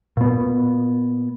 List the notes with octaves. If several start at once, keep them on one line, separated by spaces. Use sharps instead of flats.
A#2 B3